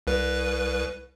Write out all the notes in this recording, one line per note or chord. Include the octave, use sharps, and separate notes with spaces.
C2 B4